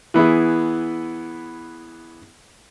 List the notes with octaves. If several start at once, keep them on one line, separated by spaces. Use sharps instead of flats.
E3 B3 E4 G#4